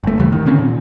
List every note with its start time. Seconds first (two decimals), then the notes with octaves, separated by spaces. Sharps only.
0.04 G1 A3
0.19 D#2 C#3 E3 G3
0.32 D#3
0.46 D3 D#3 C4 C#4
0.58 A#2